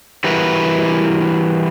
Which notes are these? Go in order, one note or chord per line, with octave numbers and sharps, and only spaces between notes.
E3 G3 E4 F#4 A#4 B4